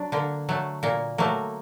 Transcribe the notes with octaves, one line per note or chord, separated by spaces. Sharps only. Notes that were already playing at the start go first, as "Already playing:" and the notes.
Already playing: F#3 D4
D3 A#3
F#3 A3
A#2 A#3
F#3 A3 A#3